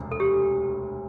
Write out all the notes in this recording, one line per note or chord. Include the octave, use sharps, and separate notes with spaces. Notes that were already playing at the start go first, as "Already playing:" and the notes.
Already playing: E1 D2 C3
A4
G4